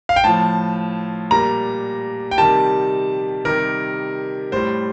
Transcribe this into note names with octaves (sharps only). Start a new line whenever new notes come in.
F5
G5
A2 F3 A5
A#2 G3 A#5
G5
C3 D#3 G3 A5
C3 D#3 G3 A#4
A2 G3 C5